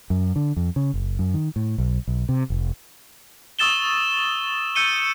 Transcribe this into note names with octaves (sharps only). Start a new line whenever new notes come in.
F#2
D3
F2
C#3
F#1
F#2
D#3
A2
B1
B1
C3
F1
C#6 D#6 E6 A6 E7 G7
E6 G6 C#7 D#7 G7